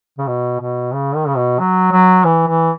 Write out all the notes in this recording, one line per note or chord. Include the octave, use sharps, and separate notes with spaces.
C#3
B2
B2
C#3
D#3
C#3
B2
F#3
F#3
E3
E3